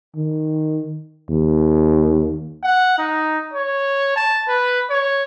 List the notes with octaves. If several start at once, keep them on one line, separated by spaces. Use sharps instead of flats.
D#3
D#2
F#5
D#4
C#5
A5
B4
C#5